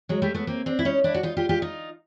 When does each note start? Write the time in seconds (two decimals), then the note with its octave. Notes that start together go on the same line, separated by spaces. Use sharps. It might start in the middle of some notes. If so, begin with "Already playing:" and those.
0.09 F#3 G#3
0.22 G3 A3
0.34 A3 B3
0.47 A#3 C4
0.66 C4 D4
0.79 E4
0.85 C#4 D#4
1.04 D4 E4
1.14 F#4
1.23 D#4 F4
1.37 F4 G4
1.49 F4 G4
1.62 D#4 F4